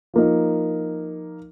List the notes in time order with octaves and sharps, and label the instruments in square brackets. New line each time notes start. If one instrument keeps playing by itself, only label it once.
[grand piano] F3 A#3 D#4